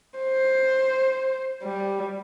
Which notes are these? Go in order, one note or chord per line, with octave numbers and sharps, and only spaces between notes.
C5
G3